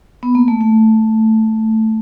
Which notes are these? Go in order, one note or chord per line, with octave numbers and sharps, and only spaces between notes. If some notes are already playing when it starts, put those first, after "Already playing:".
B3
A#3
A3
A3